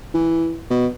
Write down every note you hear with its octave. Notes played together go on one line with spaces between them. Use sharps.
E3
B2